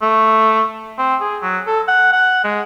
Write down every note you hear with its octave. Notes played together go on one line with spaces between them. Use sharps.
A3
C4
G#4
F#3
A4
F#5
F#5
G#3